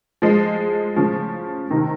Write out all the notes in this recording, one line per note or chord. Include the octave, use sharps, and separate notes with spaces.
F3 G#3
C#3 F3
C3 D#3